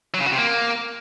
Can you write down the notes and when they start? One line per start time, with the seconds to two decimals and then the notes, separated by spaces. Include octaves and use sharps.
0.14 F#3
0.20 C#3
0.26 F#4
0.32 C3
0.38 A#3